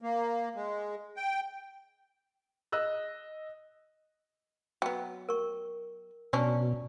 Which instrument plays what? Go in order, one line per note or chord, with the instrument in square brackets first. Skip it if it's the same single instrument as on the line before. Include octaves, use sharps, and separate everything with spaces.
[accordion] A#3
G#3
G5
[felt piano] D#5 E6 F#6
[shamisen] F#3 B3 [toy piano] G5
[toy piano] A#4 C#6
[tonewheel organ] B2 [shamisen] F#3 C#4 D4 [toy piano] D5